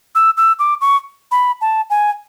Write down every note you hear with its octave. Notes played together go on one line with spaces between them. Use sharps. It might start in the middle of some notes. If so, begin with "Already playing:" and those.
E6
E6
D6
C#6
B5
A5
G#5